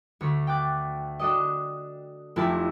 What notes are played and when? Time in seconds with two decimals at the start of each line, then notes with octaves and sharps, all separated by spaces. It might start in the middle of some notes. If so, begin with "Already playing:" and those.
0.21 D2 C#5
0.47 G5 D6 F#6 A6
1.19 D4 F#4 A4 D5 D#5
2.36 F1 F2 E4 G4 A5